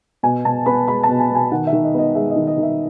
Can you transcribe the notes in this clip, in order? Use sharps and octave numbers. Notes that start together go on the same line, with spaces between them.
B2 G#5
B2 A5
B3 B5
G#3 B5
A5
B2
G#5
B2
G#5
D#3 F#5
E5
D#3
D#5
B3 D#5
G#3 E5
D#5
D#3
D#5
D#3
E5